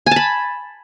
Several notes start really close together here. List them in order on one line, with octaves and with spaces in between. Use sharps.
G#5 A5 B5